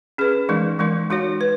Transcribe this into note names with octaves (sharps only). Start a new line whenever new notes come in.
C#4 G#4 B4
E3 G#3 D#4 A#4
E3 G#3 D#4 A#4
G#3 D#4 F#4 C#5
B4